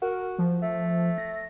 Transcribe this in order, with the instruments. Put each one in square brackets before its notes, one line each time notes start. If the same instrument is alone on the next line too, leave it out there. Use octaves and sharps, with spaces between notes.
[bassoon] F#4 [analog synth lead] A#4
[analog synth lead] F3
[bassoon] A3
[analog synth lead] A#6